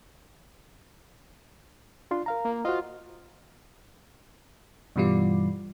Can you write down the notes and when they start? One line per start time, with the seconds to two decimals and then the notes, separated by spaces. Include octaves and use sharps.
2.11 D4 F4 C6
2.26 A#4 F5 A#5
2.45 A#3
2.65 F4 F#4 C5 D#5
4.96 G2 B2 E3 G3 F4